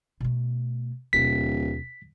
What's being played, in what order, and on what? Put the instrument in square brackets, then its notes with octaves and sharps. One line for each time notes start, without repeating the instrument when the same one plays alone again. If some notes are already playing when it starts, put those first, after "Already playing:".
[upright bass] B2 A3
[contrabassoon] D1 [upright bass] D#2 B2 [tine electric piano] B6